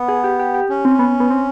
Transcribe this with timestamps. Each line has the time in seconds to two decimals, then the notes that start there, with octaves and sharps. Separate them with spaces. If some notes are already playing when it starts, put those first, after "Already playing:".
Already playing: B3
0.09 G#4
0.24 G4
0.39 G4
0.54 G4
0.69 C#4
0.85 C4
0.99 B3
1.20 B3
1.31 C4